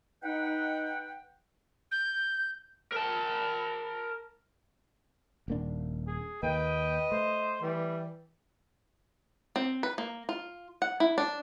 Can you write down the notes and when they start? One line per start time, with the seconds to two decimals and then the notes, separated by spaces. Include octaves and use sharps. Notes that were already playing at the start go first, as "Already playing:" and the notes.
0.23 D#4 B4 F#5 G5
1.91 G6
2.92 A#4 A5
5.48 D#1 A#3 D4
6.07 G#4
6.43 D#2 A#3 B4 D#5 G5
7.12 A3 C5
7.62 E3 G3
9.56 C4
9.83 B4
9.98 A#3
10.29 F4
10.82 F#5
11.00 E4
11.18 D4